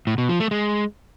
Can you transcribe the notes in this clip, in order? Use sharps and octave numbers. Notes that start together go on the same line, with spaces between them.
A2
B2
F3
A3
G#3